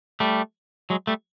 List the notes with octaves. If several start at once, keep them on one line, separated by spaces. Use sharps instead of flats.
G3 A3
F#3 G#3
G3 A3